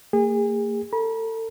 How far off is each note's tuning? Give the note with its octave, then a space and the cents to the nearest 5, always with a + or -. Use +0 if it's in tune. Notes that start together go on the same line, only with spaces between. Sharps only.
A#3 -45 G#4 -35
A4 +35 B5 -40